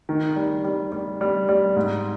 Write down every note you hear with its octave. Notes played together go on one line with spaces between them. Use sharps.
D#3
G3
G3
G3
G3
G3
G#2